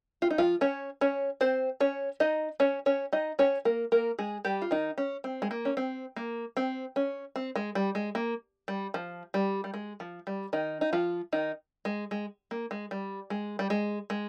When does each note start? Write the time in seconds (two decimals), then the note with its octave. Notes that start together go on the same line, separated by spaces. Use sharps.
0.22 F4
0.31 D#4
0.38 F3 F4
0.61 C#4 C#5
1.01 C#4 C#5
1.41 C4 C5
1.80 C#4 C#5
2.20 D#4 D#5
2.60 C#4 C#5
2.86 C#4 C#5
3.13 D#4 D#5
3.39 C#4 C#5
3.65 A#3 A#4
3.92 A#3 A#4
4.19 G#3 G#4
4.45 G3 G4
4.62 F4
4.71 D#3 D#4
4.98 C#4
5.24 C4
5.42 G#3
5.51 A#3
5.65 C#4
5.77 C4
6.16 A#3
6.57 C4
6.96 C#4
7.36 C4
7.56 G#3
7.75 G3
7.95 G#3
8.15 A#3
8.68 G3
8.94 F3
9.34 G3
9.64 G3
9.74 G#3
10.00 F3
10.27 G3
10.53 D#3 D#4
10.81 D#4
10.93 F3 F4
11.33 D#3 D#4
11.85 G#3
12.11 G#3
12.51 A#3
12.71 G#3
12.91 G3
13.30 G#3
13.59 G3
13.70 G#3
14.10 G#3